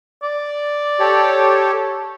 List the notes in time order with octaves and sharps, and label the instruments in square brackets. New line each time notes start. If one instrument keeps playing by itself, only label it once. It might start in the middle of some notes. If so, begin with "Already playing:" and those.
[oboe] D5
[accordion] G4 A4 C#5